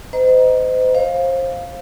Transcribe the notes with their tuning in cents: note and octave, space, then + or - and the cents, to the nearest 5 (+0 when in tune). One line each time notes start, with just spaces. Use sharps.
C5 -35 D#5 +0 A#5 +20
C5 +30 F5 +0